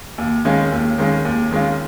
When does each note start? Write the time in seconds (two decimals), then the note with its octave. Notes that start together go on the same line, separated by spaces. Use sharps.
0.18 D#2
0.45 D#3 G#3 C#4 F4
0.72 D#2
0.98 D#3 G#3 C#4 F4
1.25 D#2
1.51 D#3 G#3 C#4 F4